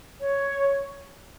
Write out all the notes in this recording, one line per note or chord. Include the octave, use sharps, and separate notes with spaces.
C#5